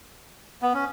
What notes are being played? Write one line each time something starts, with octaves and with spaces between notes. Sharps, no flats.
B3
C#4